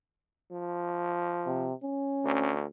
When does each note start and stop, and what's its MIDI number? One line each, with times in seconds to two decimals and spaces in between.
0.52 1.68 53
1.46 1.74 48
1.83 2.55 61
2.25 2.64 38